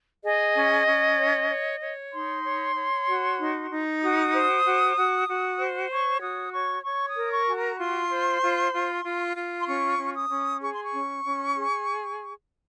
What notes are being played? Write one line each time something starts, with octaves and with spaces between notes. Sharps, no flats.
G#4 D#5
C#4
C#4
C#5
C#5
C#5
D#4 C6
C#5
C#5
F#4
D#4
D#4
F#4 D#6
C5
F#4
F#4
F#4
C5
C#5 C#6
F#4 D#6
C#5 C#6
C#5 C#6
D#6
A#4
C#6
F#4 G#5
A#5
F4 C6
C5
F4
F4
F4
F4
C6
C#4 C#6
C#4
D#6
C#4
G#4 C#6
C6
C#6
C#4
C#4
G#4